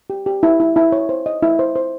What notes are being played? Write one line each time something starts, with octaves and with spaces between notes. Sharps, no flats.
G4
G4
E4
E4
E4
C#5
C5
D#5
E4
C5
C5